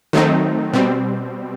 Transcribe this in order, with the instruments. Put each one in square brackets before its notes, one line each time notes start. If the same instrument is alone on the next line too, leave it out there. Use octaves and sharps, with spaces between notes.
[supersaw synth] D#3 F#3 A3 C4 D#4
B2 G3 C4